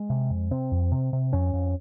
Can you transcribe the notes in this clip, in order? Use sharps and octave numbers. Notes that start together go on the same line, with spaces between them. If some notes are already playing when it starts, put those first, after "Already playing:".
Already playing: G#3
C3
F2
C3 C4
F2
C3
C3
F2 C#4
F2